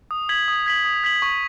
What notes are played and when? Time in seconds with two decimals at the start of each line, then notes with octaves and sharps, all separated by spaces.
0.11 D#6
0.29 G#6 B6 F#7
0.48 D#6
0.66 G#6 B6 F#7
0.85 D#6
1.04 G#6 B6 F#7
1.22 C#6